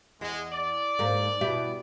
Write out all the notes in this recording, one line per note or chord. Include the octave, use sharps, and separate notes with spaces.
E2 G#3
D5
G#2 A#3
B2 E4 G4